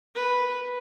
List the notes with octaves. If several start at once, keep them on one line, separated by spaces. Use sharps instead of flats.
B4